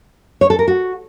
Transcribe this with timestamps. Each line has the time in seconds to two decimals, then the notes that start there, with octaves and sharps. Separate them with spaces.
0.41 C#5
0.50 A4
0.59 A#4
0.68 F#4